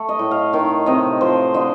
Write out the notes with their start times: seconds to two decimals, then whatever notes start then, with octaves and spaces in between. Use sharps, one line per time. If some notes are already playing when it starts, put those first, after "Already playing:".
Already playing: A3
0.09 D#5
0.19 A2
0.31 F5
0.53 D#3 F5
0.86 C3 D#5
1.21 F3 C5
1.54 D3 D#5